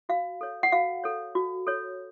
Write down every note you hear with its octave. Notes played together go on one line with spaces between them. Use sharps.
F#4 F5
A4 C#5
F#5
F#4 F5
A4 C#5
F#4
A4 C#5